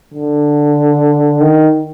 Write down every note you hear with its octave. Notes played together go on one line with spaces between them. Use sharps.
D3
D#3